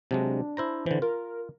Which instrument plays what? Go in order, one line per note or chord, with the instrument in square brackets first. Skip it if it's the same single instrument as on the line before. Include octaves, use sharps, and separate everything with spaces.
[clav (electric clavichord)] C3 F#3 G#3 [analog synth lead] D4
[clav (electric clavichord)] E4 C5 A#5
[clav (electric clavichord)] D3 E3 [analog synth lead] C5
[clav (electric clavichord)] F4 [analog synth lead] A#4